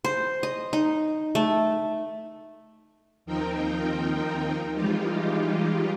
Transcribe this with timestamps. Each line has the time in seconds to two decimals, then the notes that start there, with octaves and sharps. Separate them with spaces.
0.05 C5
0.43 D#5
0.73 D#4
1.35 A3
3.26 D#2 F3 C4 D#4 A#4 G5
4.75 E3 G3 G#3 D#4 F4 G4